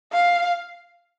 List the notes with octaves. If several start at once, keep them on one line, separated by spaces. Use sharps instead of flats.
F5